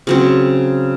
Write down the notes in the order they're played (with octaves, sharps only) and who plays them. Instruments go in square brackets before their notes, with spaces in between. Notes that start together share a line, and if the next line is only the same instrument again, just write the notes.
[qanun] C#3 F#3 C4